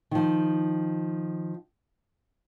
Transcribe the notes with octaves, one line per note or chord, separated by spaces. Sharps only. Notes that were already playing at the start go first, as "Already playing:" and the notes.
D#3 F3